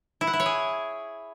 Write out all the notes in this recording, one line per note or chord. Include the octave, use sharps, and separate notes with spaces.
E4
F#5
E4
C#5
G#4